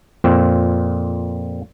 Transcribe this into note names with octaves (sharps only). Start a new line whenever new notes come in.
F2 A#2 C4